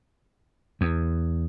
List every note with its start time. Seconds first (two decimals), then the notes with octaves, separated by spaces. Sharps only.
0.81 E2